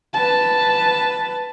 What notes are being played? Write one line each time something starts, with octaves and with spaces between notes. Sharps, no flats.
B4 A5